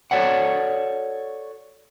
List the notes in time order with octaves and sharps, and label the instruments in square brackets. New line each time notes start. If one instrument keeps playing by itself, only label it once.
[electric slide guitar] F#4 A4 C#5 D5 F#5